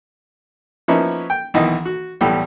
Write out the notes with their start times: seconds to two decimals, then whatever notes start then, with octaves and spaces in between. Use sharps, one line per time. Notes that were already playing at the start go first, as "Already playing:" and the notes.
0.88 F3 A#3 B3 C#4 D#4 E4
1.30 G5
1.54 B1 D#3 E3 D#5
1.85 F#4
2.21 B1 A2 E3 G3 G4